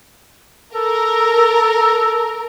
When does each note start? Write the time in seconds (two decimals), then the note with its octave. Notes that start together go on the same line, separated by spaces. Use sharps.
0.75 A4 A#4